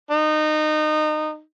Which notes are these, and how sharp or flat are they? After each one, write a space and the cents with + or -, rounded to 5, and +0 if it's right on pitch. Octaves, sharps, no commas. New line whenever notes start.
D#4 -25